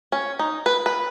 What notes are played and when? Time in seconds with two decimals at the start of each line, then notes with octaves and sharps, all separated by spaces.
0.12 C#4
0.39 D#4
0.66 B4
0.86 B4